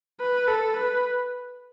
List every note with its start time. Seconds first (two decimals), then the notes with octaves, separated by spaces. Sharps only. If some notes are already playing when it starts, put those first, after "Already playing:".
0.20 B4
0.48 A4
0.77 B4